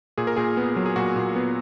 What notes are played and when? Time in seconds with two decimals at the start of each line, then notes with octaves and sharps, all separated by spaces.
0.18 A#2 G#4
0.27 A#4
0.36 A#2 G#4
0.57 B3
0.76 F#3
0.86 G#4
0.96 A#2 F#4
1.16 A#2
1.36 B3